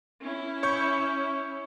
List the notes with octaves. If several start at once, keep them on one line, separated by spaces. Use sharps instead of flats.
C#4 E4
C#5 C#6 G6